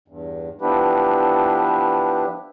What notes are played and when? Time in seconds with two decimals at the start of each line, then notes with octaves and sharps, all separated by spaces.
0.08 E2 G2
0.61 F3 B3 D4 E4 G4 B4